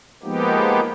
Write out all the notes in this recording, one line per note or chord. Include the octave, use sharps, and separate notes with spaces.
F3 G#3 A#3 B3 D#4 G4